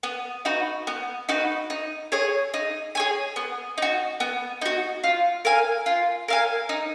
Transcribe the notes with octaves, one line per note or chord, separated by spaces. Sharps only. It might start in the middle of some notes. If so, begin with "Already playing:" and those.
B3
D#4 F#4 B4
B3
D#4 F#4 B4
D#4
G#4 C#5 G#5
D#4
G#4 C#5 G#5
B3
D#4 F#4
B3
D#4 F#4
F4
A#4 F5 G#5
F4
A#4 F5 G#5
D#4